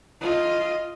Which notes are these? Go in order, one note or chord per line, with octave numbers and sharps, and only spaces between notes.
F4 D#5